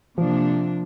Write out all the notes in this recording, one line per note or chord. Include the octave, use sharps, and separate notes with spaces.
C3 F3 A#3 D4